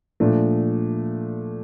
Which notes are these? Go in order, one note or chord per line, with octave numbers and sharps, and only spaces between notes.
A#2 F3 A3 D4